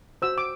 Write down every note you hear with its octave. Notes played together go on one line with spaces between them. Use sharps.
F#4 C5 E6
D6